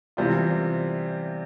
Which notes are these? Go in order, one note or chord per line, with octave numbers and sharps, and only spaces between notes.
C3 E3 G3 C4 F4